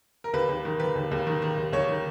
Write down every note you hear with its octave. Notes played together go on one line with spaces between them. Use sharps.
A#4
D#2 B4
D#2
D#3
D#3 B4
D#2
D#2
D#3
D#3
D#2
D#2 C#5
D#3